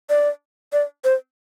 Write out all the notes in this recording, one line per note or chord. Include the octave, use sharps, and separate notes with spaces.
D5
D5
C5